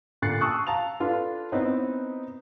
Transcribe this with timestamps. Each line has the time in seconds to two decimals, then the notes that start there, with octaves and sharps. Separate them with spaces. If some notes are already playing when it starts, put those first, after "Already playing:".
0.22 A#2 D3 F#6 A6 C7 C#7
0.41 A5 C6 C#6 D#6 E6 F#6
0.67 F5 A5 A#5 F7
1.00 D4 F4 A4 B4
1.52 B3 C4 D#4 E4 B4 C#5